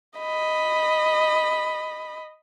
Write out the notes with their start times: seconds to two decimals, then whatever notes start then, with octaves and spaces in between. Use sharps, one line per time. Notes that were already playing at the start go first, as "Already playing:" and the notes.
0.19 D#5 B5